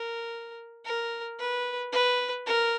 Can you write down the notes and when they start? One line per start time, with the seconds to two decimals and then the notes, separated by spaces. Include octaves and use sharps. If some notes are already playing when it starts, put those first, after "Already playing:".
Already playing: A#4
0.85 A#4
1.39 B4
1.93 B4
2.47 A#4